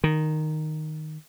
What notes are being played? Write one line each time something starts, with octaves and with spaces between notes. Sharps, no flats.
D#3